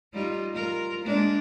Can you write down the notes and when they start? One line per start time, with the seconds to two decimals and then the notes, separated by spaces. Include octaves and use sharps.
0.13 G3 D#4 F4
0.54 F4 A#4
1.04 G#3 A#3 D4